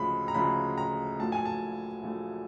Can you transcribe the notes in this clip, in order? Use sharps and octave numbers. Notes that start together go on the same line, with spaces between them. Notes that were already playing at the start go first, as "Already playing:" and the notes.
Already playing: D2 C#3 F3 G#3 B5
A#5
D2 C#3 F3 G#3 B5
A#5
A#1 A#2 F#3 A3 A5
G#5
A5
A#1 A#2 F#3 A3